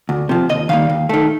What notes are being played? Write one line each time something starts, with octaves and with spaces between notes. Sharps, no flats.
D2
C3 F3
D#2 D#5
D#3 G3 A#3 F5
D#2
D#3 A3